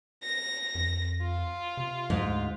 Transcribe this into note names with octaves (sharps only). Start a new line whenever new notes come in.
A#6
F2
F4
C3
D2 G#2